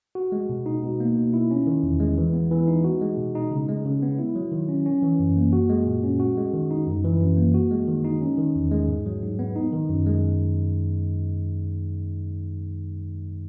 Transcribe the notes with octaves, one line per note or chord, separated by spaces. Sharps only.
F#4
G#3
B2
D#4
B2
A#3
B2
E4
C#4
D#3
E2
G#3
E3
B3
E3
D#4
F#4
G#3
B2
D#4
C#3
G#3
C#3
B3
E4
F#3
D#3
C#4
C#4
E3
F#2
A#3
F#4
G#3
A#2
C#4
F#4
G#3
D#3
D#4
F#2
E3
F#2
A#3
F#4
G#3
D#3
D#4
C#4
D#3
E2
G#3
G#2
F#3
G#2
B3
D#4
D#3
F#2
G#3